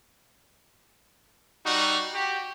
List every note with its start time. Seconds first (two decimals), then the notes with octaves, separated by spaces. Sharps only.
1.64 G3 D#4 F#4
2.13 F#4 G4